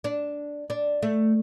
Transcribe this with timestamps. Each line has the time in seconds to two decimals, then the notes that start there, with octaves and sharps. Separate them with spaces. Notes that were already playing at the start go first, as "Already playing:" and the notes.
0.04 D4
0.70 D4
1.02 A3